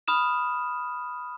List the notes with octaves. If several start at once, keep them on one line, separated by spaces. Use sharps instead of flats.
B5 D#6 F6 E7